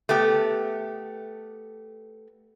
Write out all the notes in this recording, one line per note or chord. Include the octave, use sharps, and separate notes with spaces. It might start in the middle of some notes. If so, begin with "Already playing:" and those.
A3 B3 G4